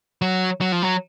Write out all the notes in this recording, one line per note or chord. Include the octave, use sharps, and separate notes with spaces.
F#3
F#3
F3
F#3